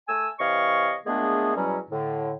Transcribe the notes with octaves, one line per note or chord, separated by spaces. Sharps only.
A3 G#5 E6
C3 E3 C#5 D#5 F5 C#6
A#2 G#3 A3 B3 D4 G#4
E2 B2 F#3 G3 C#4
A2 D3